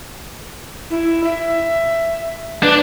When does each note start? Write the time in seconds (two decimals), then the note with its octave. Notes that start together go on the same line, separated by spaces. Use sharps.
0.90 E4
1.24 E5
2.63 D4 B4